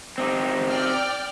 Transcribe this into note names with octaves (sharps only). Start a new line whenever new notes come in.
C4 D#4 G4
D5 G5 F6